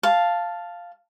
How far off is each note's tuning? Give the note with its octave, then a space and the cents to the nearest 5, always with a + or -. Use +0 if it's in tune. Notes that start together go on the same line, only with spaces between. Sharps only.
F5 +0 A5 +0